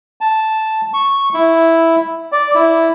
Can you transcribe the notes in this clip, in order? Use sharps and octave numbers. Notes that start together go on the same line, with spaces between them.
A5
C#6
E4
D5
E4